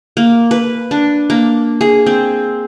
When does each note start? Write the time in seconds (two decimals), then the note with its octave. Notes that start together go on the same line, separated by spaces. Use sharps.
0.17 A#3
0.51 B4
0.91 D4
1.30 A#3
1.81 G#4
2.06 C4